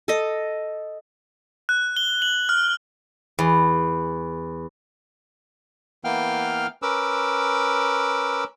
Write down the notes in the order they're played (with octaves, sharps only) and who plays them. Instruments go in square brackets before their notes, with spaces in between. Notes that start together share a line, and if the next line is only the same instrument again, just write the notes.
[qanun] A4 D#5
[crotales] F#6
G7
F#7
F6
[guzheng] E2
[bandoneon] E3 A#3 B3 F5 G5 F6
C#4 A#4 B4 D6 E6